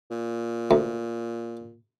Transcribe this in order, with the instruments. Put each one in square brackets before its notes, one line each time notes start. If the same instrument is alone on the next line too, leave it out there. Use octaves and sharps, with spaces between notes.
[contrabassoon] A#2
[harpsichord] D2